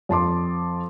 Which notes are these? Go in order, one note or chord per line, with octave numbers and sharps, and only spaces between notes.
F2 A5 C6 D6